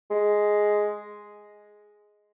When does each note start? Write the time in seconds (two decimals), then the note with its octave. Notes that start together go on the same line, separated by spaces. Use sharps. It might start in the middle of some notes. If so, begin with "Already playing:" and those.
0.10 G#3